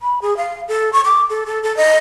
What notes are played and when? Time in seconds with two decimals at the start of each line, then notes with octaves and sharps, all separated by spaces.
0.01 B5
0.22 G#4
0.37 F5
0.68 A4
0.93 C#6
1.05 D6
1.30 A4
1.46 A4
1.63 A4
1.77 D#5